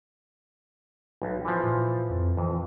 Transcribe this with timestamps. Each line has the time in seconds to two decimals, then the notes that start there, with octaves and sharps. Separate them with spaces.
1.22 B1
1.45 E3 F3
1.63 A#2
2.10 F2
2.37 F2 E3